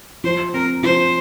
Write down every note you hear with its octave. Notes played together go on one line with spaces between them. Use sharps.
F3 C5
C4 A#4
F3 C5